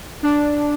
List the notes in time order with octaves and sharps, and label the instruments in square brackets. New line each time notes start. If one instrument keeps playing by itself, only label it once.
[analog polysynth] D4